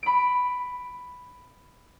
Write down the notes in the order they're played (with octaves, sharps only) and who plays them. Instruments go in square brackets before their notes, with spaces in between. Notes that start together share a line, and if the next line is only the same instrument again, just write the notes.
[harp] B5 D7